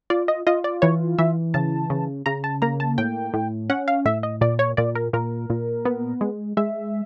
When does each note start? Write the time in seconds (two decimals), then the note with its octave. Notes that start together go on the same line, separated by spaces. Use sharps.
0.10 F4 D5
0.28 D#5
0.47 F4 D#5
0.64 D5
0.82 E3 C#5
1.18 E3 E5
1.54 C#3 A5
1.90 C#3
2.26 C#3 A#5
2.44 A5
2.62 A#3 A#5
2.80 A5
2.98 A2 G5
3.34 A2
3.70 C#4 F#5
3.88 F5
4.05 A2 E5
4.23 D#5
4.41 A#2 D5
4.59 C#5
4.77 A#2 D5
4.95 A#4
5.13 A#2 A#4
5.50 A#2
5.85 B3
6.21 G#3
6.57 G#3 E5